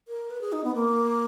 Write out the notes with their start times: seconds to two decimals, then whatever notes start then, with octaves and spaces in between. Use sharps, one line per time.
0.08 A#4
0.30 B4
0.41 G#4
0.52 D#4
0.64 B3
0.74 A#3